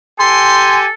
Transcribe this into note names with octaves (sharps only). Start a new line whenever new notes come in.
G4 A4 G5 G#5 C6